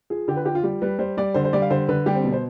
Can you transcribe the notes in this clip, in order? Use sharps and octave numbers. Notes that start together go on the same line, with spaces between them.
F3 G#4
D3 G4
B4
F3 G4
F4
G3 G4
G3 B4
G3 C5
G3 D5
D3 C5
C5
G3 D5
F5
D3 C5
D3 B4
G3 G4
C4
B2
C5